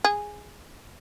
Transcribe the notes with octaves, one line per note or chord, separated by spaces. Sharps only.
G#4